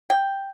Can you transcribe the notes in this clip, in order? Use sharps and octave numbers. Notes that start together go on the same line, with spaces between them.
G5